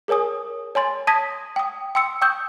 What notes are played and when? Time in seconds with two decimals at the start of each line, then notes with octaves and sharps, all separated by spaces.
0.08 G#4 A#4 C#5 G#5 D#6
0.75 C#5 G#5 C6 A6
1.07 A5 D#6 G#6 A#6 B6
1.56 G5 D#6
1.95 G5 C6 E6 C#7
2.22 G5 C#6 D#6 E6 G6